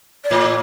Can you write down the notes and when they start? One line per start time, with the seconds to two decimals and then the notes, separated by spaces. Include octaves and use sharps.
0.24 D5
0.31 A2 C#5